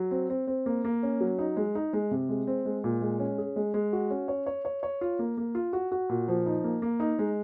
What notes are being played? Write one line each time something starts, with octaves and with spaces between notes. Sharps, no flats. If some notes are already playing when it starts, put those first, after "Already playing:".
Already playing: F#3
C4
C4
C4
A#3
A#3
C#4
F#3
D#4
G#3
D#4
G#3
C3
G#3
C4
G#3
A#2
G#3
C#4
G#4
G#3
G#3
F#4
C#4
C#5
C#5
C#5
C#5
F4
A#3
A#3
F4
F#4
F#4
A#2
F3
D#4
A#3
A#3
D#4
G#3